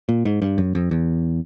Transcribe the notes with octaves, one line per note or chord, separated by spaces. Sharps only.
A#2
G#2
G2
F#2
F2
E2